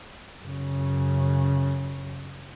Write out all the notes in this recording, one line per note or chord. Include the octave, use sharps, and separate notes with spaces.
F#2 C#3